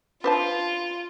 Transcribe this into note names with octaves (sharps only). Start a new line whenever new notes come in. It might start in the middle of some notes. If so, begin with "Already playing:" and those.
D4 F4 B4 C5 A5